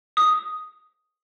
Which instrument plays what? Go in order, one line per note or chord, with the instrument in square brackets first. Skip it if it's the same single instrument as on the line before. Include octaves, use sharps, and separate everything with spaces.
[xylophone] D#6